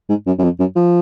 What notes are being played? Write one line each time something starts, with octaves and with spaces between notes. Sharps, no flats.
G#2
F#2
F#2
F2
F#2
F3